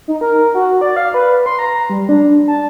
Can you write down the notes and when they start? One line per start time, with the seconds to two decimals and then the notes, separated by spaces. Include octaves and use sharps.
0.08 D#4
0.21 A#4
0.55 F#4
0.81 D5
0.96 F5
1.14 B4
1.46 C6
1.59 A#5
1.90 G3
2.09 D4
2.48 A5